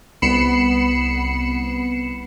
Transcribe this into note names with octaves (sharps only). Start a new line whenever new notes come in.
C2 B3 B5 C7 C#7 E7